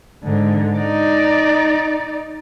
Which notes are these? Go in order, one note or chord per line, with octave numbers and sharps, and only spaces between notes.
G#2 D3
D#4 D5